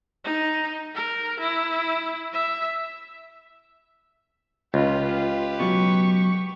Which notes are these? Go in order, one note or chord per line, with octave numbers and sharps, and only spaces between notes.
D#4
A#4
E4
E5
C#2 F4 G4 B4
B2 F#3 C#6